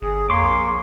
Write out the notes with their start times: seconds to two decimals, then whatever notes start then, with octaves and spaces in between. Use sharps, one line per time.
0.02 G1 G#4
0.30 F2 A#3 C#5 C6 D6
0.44 A#1